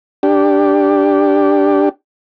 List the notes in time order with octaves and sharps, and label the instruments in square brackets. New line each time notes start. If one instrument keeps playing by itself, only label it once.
[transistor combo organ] D4 G4